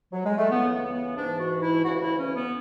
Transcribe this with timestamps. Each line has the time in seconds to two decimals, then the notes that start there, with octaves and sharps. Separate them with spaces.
0.12 F#3
0.26 G#3
0.38 A3
0.50 C#2 C#3 E3 B3
0.73 B3
0.94 B3
1.16 G#2 E3 D4
1.39 F#4
1.61 E4
1.83 D2 C#3 E3 F#4
1.95 F#4
1.99 E4
2.16 C#4
2.33 B3